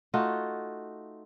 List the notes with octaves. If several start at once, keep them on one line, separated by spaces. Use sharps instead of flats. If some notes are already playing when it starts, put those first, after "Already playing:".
A3 D#4 F4 F#4